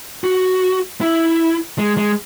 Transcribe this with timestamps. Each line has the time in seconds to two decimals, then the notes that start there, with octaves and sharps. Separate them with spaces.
0.24 F#4
1.01 E4
1.78 G#3
1.97 G#3